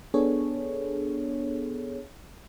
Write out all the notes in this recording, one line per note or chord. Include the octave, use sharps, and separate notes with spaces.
B3 D4 G#4 A4 C#5